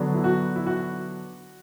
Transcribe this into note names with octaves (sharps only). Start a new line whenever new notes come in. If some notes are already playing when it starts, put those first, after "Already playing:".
Already playing: D3 F#3 B3 D4
E4
F#4
E4
F#4